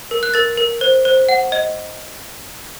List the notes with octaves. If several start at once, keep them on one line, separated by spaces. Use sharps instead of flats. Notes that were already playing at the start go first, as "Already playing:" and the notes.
A#4
F#6
A#4 A6
A#4
C5
C5
F#5
D#5